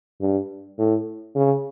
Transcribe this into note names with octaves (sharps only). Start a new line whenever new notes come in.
G2
A2
C#3